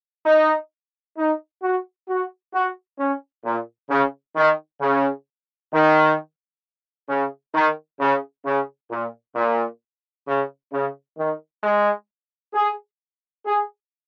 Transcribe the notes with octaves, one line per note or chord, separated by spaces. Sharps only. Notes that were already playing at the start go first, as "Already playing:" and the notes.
D#4
D#4
F#4
F#4
F#4
C#4
A#2
C#3
D#3
C#3
D#3
C#3
D#3
C#3
C#3
A#2
A#2
C#3
C#3
D#3
G#3
G#4
G#4